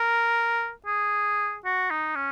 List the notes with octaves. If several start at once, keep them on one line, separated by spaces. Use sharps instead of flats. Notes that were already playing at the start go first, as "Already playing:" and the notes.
Already playing: A#4
G#4
F#4
D#4
C#4